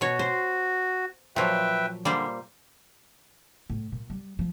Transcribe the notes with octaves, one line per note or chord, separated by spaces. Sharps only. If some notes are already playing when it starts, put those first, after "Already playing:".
B2 F#4 C#5
C5
A#2 F3 F#3 B4 E5 G5
D3 G3 A#3 C5
A2
A#2
G3
F3